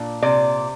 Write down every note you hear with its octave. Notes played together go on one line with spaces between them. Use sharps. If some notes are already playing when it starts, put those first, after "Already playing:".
Already playing: A#2 D4
C3 D5